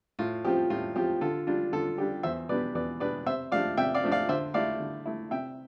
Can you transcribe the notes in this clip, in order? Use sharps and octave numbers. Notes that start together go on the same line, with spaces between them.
A2 F4
F3 C4 F4 G4
A2 F4
F3 C4 F4 G4
D3 F4 A4
G3 D4 F4
D3 F4 A4
G3 D4 F4 G4
E2 C5 E5
B2 G3 B3 D4 B4 D5
E2 B4 D5
B2 G3 B3 D4 B4 D5
C3 C5 E5
F3 A3 D4 D5 F5
C3 E5 G5
D5 F5
F3 A3 D4
D5 F5
D3 C5 E5
A3 E4 D5 F5
D3
A3 E4
C3 E5 G5